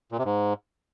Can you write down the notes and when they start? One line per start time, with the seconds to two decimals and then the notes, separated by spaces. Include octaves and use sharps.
0.12 A#2
0.19 C3
0.25 G#2